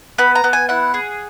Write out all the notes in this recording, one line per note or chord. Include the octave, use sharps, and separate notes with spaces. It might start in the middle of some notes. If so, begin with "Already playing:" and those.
B3 B5
A#5
B3
G#5
E4 F#5
G#4